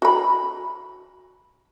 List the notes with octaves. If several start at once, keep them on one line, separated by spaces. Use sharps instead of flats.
F#4 B5